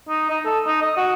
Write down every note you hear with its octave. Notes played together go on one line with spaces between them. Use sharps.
D#4
D#4
A4
D#4
D#5
F#4